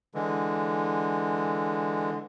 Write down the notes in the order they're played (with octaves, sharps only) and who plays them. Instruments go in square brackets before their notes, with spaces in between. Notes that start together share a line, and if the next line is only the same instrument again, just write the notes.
[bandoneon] D3 E3 G#3